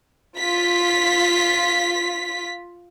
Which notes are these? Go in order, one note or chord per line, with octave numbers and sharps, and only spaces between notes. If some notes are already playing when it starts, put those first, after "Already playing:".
F4 B6